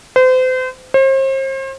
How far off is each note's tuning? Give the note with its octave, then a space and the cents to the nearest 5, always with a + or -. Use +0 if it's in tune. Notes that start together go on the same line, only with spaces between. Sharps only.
C5 -35
C5 +40